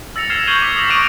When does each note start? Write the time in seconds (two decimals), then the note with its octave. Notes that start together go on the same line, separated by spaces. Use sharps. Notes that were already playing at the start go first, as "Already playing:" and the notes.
0.16 E6 A6 A#6 C#7 F7
0.30 F6 G#6 A6 C7 E7
0.47 C#6 G6 G#6 D#7 F#7 G7
0.62 D6 B6
0.77 D#6 A#6 E7 G7
0.90 C#6 F#6 B6 D7 D#7